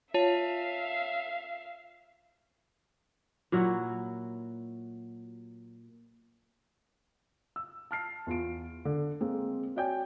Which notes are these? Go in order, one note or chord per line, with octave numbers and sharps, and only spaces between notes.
F4 C#5 E5 F5 A5
A#2 F#3 E4 F#4
E6
A5 F6 C7
E2 F4 D7
D3
G#3 A#3 C4
F#4 C#5 D5 G5 G#5 G6